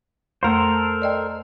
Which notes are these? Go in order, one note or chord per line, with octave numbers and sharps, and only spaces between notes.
F2 A3 A4 A#4 C5
D5 D#5 G5